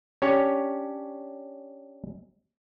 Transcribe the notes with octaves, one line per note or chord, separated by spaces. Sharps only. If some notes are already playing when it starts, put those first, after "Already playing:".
C#4 D4 G4 C#5